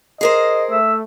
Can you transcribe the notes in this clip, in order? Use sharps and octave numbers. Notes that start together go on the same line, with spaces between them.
G#4 A#4 C5 D#5
A3 E5